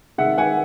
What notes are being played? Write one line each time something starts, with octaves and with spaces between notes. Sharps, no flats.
C3 D#3 G#3 E5 F#5
F#5 G#5